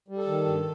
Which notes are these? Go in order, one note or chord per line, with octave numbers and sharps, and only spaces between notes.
G3
A4
D#3
G2